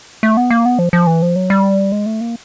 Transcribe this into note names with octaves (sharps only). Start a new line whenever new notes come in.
A3
B3
A#3
B3
F3
F3
E3
F3
F#3
G3
G#3
A3
A#3